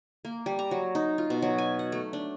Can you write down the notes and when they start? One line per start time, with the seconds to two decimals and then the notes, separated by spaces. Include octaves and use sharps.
0.25 A#3
0.46 G3
0.59 A#5
0.71 F#3
0.95 D#4
1.18 F4
1.30 B2
1.42 F#3
1.58 G#5
1.79 F#5
1.92 A3
2.13 D4